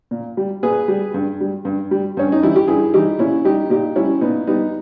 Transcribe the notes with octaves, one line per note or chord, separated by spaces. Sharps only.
A#2
G3
A#2 G#4 B4
G3
G2
G3
G2
G3
G2 C#4
D#4
E3 G3 E4
G4
G2 E4 G#4
E3 G3 D#4 G4
A#2 C#4 E4
G3 D#4 G4
A#2 D#4 G4
G3 C#4 E4
A#2 B3 D#4
G3 B3 D#4